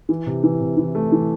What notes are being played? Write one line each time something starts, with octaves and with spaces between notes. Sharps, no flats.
E3
C3
E3
C3
E3
A3
E3